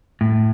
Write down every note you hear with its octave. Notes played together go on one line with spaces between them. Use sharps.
A2